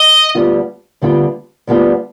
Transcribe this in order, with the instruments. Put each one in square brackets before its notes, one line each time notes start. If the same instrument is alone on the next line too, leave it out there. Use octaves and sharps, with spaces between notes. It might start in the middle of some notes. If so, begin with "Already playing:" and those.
Already playing: [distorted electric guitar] D#5
[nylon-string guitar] D2 D3 G3 B3 F4
D2 D3 G3 B3 F4
D2 D3 G3 B3 F4